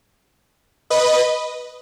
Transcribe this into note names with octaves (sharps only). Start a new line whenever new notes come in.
B4 D#5